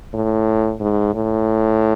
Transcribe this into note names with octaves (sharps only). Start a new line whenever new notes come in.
A2
G#2
A2